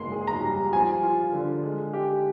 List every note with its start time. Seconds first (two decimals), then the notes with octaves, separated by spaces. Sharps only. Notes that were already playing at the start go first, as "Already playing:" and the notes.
Already playing: G#3 A#3 C6
0.12 G#4
0.27 A#5
0.42 G3
0.72 F3 G#5
1.03 F4
1.33 D3
1.63 G#3
1.93 G4